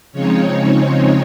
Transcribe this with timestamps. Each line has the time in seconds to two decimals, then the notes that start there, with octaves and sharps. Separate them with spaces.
0.13 C#3 F3 G#3 C4 D#4 C#5